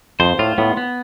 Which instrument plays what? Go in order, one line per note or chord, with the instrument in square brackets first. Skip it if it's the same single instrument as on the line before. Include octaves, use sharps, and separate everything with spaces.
[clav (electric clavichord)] F2 [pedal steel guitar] C5
[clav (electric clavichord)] A2 [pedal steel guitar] F4
[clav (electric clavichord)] A2 [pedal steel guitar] B3
[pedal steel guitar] B3